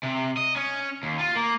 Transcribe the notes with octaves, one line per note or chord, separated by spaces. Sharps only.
C3
D#5
C#4
D#2
F4
A#3